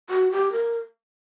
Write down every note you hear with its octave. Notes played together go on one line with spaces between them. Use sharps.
F#4
G4
A#4